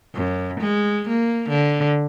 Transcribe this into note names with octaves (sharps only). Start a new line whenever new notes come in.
F#2
G#3
A#3
D3